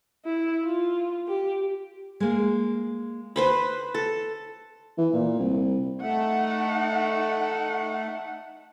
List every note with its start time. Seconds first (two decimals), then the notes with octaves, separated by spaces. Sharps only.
0.25 E4
0.63 F4
1.28 G4
2.20 G#3 A#3
3.36 B4 C5 B5
3.94 A4
4.98 E3
5.13 A#2
5.39 C2
6.02 A3 D#4 F#5